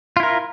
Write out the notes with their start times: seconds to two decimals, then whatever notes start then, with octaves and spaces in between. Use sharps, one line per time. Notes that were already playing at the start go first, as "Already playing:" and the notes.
0.17 F4
0.20 E4
0.23 A#4